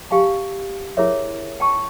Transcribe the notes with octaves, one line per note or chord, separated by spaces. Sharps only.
G4 F5 G#5 A5
E4 G#4 A#4 C#5 E5
G5 A5 C#6